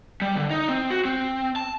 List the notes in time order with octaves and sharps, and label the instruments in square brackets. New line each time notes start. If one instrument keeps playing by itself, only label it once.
[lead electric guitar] G3
D3
D#4
C4
F#4
C4
A5